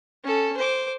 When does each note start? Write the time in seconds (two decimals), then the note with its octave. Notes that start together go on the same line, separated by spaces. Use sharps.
0.24 C#4 A4
0.57 C5 D6